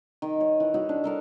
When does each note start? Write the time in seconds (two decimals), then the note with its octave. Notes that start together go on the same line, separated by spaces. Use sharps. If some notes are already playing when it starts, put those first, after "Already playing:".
0.22 D#3
0.41 C#5
0.60 E3
0.74 D#4 E4 F#4 C#5
0.89 D4
1.04 A4 A#4 D#5